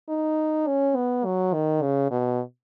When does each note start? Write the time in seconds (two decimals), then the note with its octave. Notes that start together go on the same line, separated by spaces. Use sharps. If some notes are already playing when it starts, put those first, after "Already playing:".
0.09 D#4
0.67 C#4
0.96 B3
1.25 F#3
1.53 D#3
1.82 C#3
2.11 B2